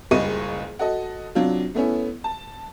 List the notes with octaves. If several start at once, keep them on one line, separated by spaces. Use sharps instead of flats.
F#1 C#2 G3 D#5 C#6 D#7
F#4 A4 D#5
C3 F#3 D4 F4
A3 B3 C#4 E4
A5